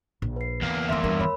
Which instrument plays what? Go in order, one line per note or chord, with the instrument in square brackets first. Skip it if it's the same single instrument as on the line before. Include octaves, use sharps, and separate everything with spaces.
[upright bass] A#1
[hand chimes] B4 C7
[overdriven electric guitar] E2 A#3
[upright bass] F3 A3 [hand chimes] E5 C6 E6
[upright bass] G2 [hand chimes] A#4
[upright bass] D#2 [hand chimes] C#5 B5